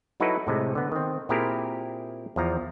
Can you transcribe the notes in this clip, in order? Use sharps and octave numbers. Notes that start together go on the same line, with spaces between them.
F#3 D#4 E4 F#4 A4 B4
A2 C3 G#3
D3 B3
D#3 C4
A#2 C4 E4 G4 G#4 A#4
E2 F3 A#5